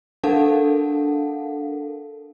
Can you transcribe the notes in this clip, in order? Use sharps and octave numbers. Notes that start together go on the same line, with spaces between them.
D4 A4 A#4 F5 F#5 A5